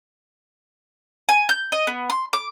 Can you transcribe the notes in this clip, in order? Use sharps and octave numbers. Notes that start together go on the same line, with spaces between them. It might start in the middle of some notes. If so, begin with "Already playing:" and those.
G#5
G6
D#5
B3
C6
D6